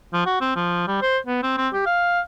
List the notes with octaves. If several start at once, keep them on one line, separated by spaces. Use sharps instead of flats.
F3
F#4
C4
F3
G3
C5
B3
C4
C4
G4
F5